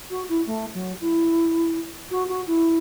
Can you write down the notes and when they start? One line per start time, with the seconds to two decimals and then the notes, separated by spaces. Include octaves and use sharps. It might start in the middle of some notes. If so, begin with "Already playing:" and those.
0.10 F#4
0.29 E4
0.46 A3
0.74 F#3
1.01 E4
2.11 F#4
2.28 F#4
2.47 E4